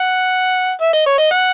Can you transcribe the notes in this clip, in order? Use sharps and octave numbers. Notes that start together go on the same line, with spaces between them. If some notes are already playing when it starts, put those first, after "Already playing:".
Already playing: F#5
E5
D#5
C#5
D#5
F#5